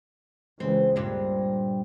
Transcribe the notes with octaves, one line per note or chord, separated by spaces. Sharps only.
C#2 E3 G#3 C4
G2 A#2 C4